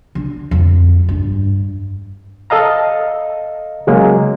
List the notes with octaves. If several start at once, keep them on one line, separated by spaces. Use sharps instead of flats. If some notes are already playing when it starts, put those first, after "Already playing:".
D3
F2
G2
A4 D#5 F5 A#5
C#3 F#3 G#3 A#3